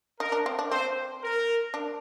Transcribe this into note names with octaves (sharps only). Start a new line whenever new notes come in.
D#4 A#4
D4
C4
D4
C4 C5
A#4
D4